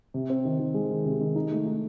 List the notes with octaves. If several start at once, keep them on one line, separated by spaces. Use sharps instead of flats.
C3
C4
D#3
D#3
G#3
D#3
C3
D#3
D#4
A3
D#4